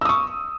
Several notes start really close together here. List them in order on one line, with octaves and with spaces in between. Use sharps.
E6 D#6 C#6